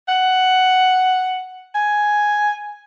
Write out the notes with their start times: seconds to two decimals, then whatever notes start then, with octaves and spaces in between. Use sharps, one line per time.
0.08 F#5
1.75 G#5